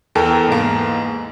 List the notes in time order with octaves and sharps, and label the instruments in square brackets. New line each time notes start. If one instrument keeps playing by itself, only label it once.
[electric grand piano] E2 [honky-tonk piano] A4 A#4 G5
[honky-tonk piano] G#2 A#3